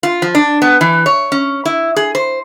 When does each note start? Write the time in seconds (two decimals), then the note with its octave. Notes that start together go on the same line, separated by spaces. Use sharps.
0.03 F4
0.22 F3
0.35 D4
0.62 B3
0.81 E3
1.06 C#5
1.32 C#4
1.65 E4
1.96 G#4
2.15 C5